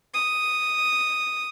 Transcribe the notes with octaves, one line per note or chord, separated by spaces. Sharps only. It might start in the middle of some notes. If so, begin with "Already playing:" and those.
D#6